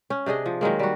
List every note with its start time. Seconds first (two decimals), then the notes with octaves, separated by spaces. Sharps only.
0.10 C#4
0.26 C3 D4 G#4 D#5
0.46 F3
0.61 D#3 F#3 G#3 A#3
0.79 G3 F#4